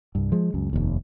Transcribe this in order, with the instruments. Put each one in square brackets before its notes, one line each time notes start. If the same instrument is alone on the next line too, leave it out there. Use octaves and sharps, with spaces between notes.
[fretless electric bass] C2 G2
F3 G#3
C#2 F#2
F1 D#2